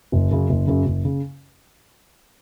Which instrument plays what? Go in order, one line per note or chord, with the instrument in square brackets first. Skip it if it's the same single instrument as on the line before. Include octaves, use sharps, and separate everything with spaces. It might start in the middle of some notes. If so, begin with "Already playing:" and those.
[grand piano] F#1
F#2 C#3
F#1
F#2 C#3
F#1
C#3